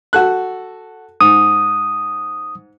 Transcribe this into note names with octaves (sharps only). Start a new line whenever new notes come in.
F#4 A4 F#6
G#2 D#6